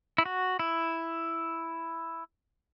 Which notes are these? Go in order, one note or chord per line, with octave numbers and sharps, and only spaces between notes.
E4
F#4
E4